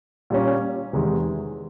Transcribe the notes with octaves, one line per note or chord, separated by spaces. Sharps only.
A#2 G3 A#3 C#4
E2 C3 D#3 G#3